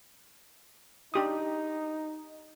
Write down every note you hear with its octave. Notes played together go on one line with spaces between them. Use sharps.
D4 D#4 G4 D#6